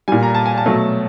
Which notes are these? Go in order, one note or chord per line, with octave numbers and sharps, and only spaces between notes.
A#2 G3 G#5
A#5
A5
G#5
A5
B2 F#3 A3